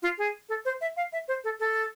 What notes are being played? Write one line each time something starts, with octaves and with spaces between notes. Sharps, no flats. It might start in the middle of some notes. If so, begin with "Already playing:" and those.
F4
G#4
A4
C5
E5
F5
E5
C5
A4
A4